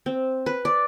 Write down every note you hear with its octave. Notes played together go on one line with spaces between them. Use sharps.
C4
B4
D5